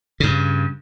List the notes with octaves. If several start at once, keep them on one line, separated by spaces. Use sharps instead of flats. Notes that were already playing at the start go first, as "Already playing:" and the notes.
G2 C#3